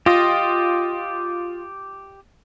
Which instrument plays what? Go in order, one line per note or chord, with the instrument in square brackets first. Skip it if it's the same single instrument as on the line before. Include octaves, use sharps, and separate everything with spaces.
[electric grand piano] F4 [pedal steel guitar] G4 D#5